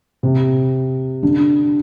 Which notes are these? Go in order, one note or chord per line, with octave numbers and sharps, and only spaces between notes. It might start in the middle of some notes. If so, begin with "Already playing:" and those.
C3
D3